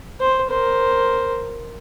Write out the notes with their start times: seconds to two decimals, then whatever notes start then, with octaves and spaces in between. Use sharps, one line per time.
0.20 C5
0.49 A#4 C5